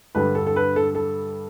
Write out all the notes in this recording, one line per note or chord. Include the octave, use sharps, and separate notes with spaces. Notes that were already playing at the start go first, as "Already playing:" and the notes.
G2 D3 G3 B4
A4
A4
B4
A4
A4